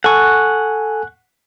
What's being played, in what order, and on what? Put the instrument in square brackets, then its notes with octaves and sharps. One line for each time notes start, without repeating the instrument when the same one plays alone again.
[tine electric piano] A4 G#5 [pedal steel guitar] F#5 C#6